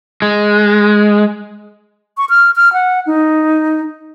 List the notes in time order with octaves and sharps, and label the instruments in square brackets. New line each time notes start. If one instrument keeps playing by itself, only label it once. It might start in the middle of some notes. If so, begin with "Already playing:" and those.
[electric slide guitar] G#3
[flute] C#6
F6
F6
F#5
D#4